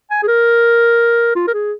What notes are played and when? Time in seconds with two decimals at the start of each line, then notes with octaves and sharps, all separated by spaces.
0.11 G#5
0.23 G#4
0.28 A#4
1.36 F4
1.48 A#4
1.54 G#4